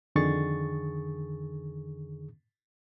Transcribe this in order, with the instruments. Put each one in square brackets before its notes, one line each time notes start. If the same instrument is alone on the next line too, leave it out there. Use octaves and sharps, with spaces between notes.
[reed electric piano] F2 D3 D#3 G#4 C#6 A6